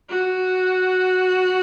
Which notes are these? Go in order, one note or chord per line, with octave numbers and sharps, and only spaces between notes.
F#4